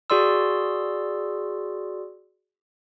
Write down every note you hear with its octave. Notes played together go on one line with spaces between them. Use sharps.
F#4 G#4 D5 C6 E6